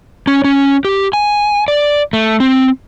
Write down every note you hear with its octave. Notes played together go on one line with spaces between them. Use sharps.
C#4
C#4
G4
G#5
D5
A3
C4